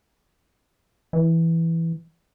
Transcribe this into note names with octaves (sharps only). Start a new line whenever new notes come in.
E3